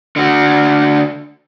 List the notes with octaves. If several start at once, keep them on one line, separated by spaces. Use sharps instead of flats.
D3 F#4